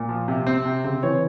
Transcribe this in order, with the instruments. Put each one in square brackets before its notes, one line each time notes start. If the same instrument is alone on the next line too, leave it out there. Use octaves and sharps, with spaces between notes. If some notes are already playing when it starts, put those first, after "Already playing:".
Already playing: [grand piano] A#2
F3
C3
C4
C3
[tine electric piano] C#3 [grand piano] C4
[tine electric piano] E3 [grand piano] C#5